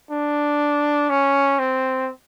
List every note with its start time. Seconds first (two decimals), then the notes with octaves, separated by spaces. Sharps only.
0.11 D4
1.10 C#4
1.59 C4